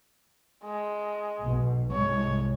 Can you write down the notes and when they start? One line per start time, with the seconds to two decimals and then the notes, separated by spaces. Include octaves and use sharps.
0.64 G#3
1.43 B1 B2
1.92 C2 G#2 G#3 C#5